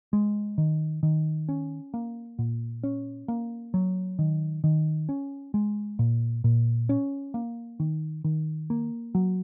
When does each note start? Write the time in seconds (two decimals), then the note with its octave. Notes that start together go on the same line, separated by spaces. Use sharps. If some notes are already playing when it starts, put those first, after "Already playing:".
0.13 G#3
0.58 D#3
1.03 D#3
1.49 C#4
1.94 A#3
2.39 A#2
2.83 C#4
3.28 A#3
3.74 F#3
4.19 D#3
4.64 D#3
5.09 C#4
5.54 G#3
5.99 A#2
6.44 A#2
6.89 C#4
7.34 A#3
7.80 D#3
8.24 D#3
8.70 A#3
9.15 F#3